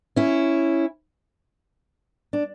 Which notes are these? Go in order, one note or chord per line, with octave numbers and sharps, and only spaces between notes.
C#4 E4
D4